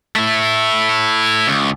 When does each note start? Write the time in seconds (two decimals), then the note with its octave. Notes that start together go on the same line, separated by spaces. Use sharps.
0.16 A3 E4
1.48 C#2